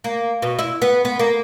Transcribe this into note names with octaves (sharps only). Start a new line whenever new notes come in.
A#3
B2
E4
B3
B3
A#3